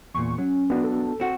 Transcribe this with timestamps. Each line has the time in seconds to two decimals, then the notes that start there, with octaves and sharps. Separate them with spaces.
0.14 E2 A#2 C#6
0.38 F#3 C#4
0.70 B3 D4 F#4
0.84 A4
1.20 C4 F#4